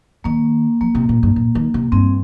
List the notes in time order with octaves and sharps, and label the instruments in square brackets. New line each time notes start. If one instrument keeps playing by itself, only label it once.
[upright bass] D#3 [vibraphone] A#3
[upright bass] F3 [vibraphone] A#3
[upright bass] C3
A#2
G2
A#2
D#3
C3
[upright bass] G2 [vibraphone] C4